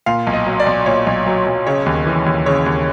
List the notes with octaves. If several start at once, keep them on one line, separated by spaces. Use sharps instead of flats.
A#2 F5
B1
D#5
F#3
D5
B1
A#2 C#5
B1
F#3
B1
C#3 C#5
D#2
E3
D#2
C#3 C#5
D#2